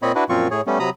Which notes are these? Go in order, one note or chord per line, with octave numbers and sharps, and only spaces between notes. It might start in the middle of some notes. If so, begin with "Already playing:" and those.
A#2 C4 C#5 D#5 B5
D4 E4 F#4 B4
F#2 A#2 F3 C4 F4 C#6
A2 G#4 C#5
G3 A3 B3 C#4
C3 F#3 A#5 B5 D#6